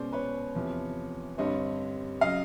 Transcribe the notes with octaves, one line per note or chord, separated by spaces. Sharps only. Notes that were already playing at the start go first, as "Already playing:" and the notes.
Already playing: B2 G#3 C#4 C5 D5
B4 C#5
E2 C3 F3
G2 D3 G3 C4 C#5 D#5
C#3 F#3 D#5 F5